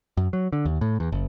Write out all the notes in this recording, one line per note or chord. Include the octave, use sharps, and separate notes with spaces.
F#2
F#3
D3
D#2
A2
E2
F#1